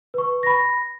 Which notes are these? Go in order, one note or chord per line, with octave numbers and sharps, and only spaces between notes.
B4 C#6
B5 A#6